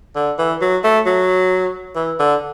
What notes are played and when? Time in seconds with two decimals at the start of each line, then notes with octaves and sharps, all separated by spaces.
0.16 D3
0.38 E3
0.61 F#3
0.84 A3
1.06 F#3
1.95 E3
2.19 D3